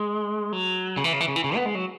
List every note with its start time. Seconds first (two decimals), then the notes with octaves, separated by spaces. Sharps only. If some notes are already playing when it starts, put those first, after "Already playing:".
Already playing: G#3
0.53 F#3
0.97 C#3
1.04 E3
1.13 C#3
1.21 E3
1.28 C#3
1.36 E3
1.44 C#3
1.56 B3
1.66 G#3
1.75 F#3